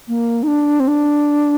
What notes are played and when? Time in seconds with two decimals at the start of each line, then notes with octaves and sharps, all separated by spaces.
0.08 A#3
0.43 D#4
0.48 D4
0.80 C4
0.88 D4